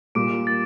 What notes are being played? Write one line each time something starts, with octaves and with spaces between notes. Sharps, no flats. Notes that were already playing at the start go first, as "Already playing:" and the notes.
A#2 G3 A#3 D6 D7
A6